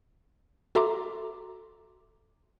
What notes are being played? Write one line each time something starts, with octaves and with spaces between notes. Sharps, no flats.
F#4 A4 E5 A#5 C6 D6